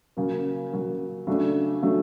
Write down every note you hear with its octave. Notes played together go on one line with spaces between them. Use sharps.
C#3 F#3 A#3
C#3 F#3 A#3
C#3 F#3 A3 D4
C#3 F#3 A3 D4